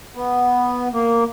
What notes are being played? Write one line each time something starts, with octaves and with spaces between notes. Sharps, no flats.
B3
A#3